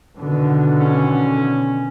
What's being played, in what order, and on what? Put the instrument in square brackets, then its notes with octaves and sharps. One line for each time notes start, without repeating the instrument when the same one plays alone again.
[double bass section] B2 D3 D#3
[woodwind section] C#4